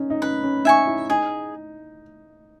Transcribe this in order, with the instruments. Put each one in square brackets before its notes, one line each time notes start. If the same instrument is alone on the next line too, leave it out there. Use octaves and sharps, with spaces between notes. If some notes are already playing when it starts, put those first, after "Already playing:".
Already playing: [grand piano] C#4 D#4
D#4
[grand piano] C#4 [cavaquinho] B4
[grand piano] C#4
[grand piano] D#4 [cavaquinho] E5 G#5 C#6
[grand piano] E4
[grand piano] D#4 [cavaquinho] G#4